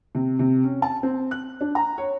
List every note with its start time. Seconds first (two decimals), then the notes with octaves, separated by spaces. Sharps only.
0.15 C3
0.39 C3
0.64 C#4
0.82 A5
1.03 C4
1.31 F#6
1.61 D4
1.75 A#5
1.98 C#5